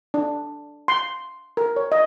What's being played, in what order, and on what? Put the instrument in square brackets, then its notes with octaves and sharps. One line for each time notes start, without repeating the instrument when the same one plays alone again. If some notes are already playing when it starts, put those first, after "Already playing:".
[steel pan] D4
C6
A#4
C#5
D#5